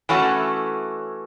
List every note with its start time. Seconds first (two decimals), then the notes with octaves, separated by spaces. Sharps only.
0.09 E3 A3 C#4 F#4